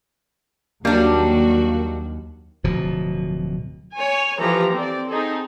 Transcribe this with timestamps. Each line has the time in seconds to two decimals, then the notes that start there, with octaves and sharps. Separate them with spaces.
0.85 D#2 F#3 G3 A#3 D4 F#4
2.64 D1 B2 F3
3.95 C#5 G#5
4.40 E3 F3 G4 A4 A#5
4.72 C4 D5
5.09 C4 D#4 G#4 A4